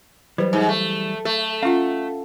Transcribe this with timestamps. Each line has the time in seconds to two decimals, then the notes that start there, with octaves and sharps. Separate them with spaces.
0.38 E3 F#3 G3 B4 C5
0.53 G#2
0.69 A3
1.25 A3 A4
1.63 C#4 F4 F5 F#5